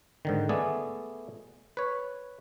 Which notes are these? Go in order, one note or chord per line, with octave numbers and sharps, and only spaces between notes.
G#2 D3 D#3
A3 B3 G#4 D5
B4 C#5